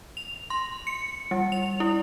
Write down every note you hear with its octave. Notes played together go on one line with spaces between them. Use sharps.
F7
C6
C#7
G3
F7
E4